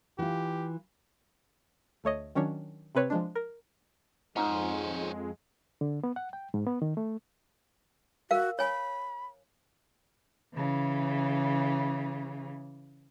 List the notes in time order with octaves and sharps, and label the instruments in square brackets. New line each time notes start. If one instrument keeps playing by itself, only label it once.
[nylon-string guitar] E3 F4 [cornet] G4
[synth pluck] D2 A3 C#5 D#5
D#3 F#3 C#4 D4 C#5
C3 C4 B4 C#5
F3 G#3 D4
A#4
[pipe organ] F2 G#3 [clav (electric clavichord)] G#2 [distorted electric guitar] C#4 C5 [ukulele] D#4 F4
[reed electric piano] D3
B3
F#5
G5
G#2
B3
D#3
A3
[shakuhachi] F#4 [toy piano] A#4 F5
[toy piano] C#5 G#5 [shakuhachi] B5
[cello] C#3 E3